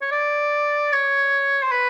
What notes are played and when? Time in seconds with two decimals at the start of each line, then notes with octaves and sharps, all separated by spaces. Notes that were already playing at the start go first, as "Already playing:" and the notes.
0.02 C#5
0.12 D5
0.92 C#5
1.63 C5
1.71 B4